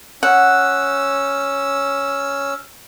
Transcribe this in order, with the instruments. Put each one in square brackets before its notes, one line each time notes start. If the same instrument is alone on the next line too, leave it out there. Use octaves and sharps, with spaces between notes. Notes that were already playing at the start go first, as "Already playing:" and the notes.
[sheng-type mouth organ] C#4 E6 [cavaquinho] F#5